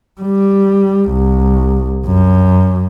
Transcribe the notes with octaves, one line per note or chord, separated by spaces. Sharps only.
G3
C2
F#2